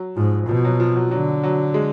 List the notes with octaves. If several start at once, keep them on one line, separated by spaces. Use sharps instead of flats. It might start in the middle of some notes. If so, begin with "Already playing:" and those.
Already playing: F#3
G#2 F3
B2 F3
F#3
F3
F#3
D3 F#3
F#3
G#3